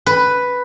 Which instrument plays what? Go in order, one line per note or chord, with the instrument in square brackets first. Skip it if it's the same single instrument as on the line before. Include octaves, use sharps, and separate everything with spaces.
[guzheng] B4